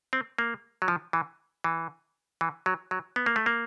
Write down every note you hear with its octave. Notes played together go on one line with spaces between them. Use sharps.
C4
A#3
F#3
F3
E3
E3
E3
F#3
F#3
B3
A#3
A3
A#3